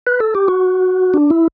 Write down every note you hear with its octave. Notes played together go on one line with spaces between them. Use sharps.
B4
A4
G4
F#4
D4
E4